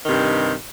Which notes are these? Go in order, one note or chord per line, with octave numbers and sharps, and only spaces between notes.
G2 C3 D#3